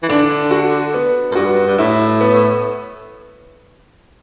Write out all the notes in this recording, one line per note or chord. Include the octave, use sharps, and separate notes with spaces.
E3
D3 D4
F#4
B3
F#2
G2 F#4
G2
A2 E4
B3